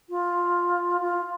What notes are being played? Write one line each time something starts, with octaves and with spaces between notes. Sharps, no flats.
F4
F4